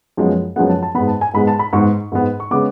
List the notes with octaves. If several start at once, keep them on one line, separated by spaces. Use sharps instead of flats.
F#2 F3 G#3 B3
F#2 F3 G#3 B3 F#5
A5
A5
G#2 G#3 B3 B5
A5
G#5
G#2 G#3 B3 B5
A5
B5
G#2 G#3 B3 C#6
G#2 G#3 B3
C#6
C#3 G#3 B3 D6